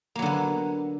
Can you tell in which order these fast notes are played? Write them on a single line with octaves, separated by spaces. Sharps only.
A#3 F#3 D3 B3